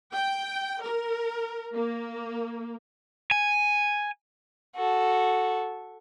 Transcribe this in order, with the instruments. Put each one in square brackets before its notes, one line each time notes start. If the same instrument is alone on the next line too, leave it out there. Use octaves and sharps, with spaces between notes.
[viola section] G5
A#4
A#3
[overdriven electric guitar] G#5
[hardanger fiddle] F#4 A4